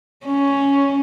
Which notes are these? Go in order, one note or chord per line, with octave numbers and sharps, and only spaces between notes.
C#4